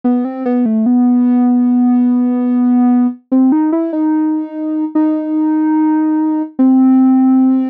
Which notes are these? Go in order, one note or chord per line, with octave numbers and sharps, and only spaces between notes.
B3
C4
B3
A3
B3
C4
D#4
E4
D#4
D#4
C4